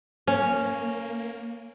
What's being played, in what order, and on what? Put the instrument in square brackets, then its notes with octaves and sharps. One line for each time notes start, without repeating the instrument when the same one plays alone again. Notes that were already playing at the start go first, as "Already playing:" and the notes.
[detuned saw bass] A#3 [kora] C#4